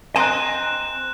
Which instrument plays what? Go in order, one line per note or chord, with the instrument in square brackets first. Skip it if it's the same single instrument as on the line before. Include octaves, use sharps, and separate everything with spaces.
[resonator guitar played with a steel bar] C4 D#5 A#5 [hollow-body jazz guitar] G#5 [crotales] F#6 E7